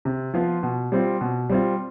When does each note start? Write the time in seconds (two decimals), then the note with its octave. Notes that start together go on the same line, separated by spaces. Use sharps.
0.05 C3
0.34 F3 B3 F4
0.63 B2
0.92 G3 C4 F4
1.21 B2
1.50 G3 C4 F4